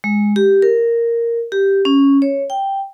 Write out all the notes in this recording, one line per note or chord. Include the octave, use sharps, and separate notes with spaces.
G#3
G4
A#4
G4
C#4
C#5
G5